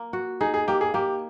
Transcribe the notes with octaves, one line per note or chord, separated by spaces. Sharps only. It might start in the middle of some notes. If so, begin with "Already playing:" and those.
Already playing: A#3
F#4
D#4 G#4
G#4
A#3 G4
G#4
A#3 G4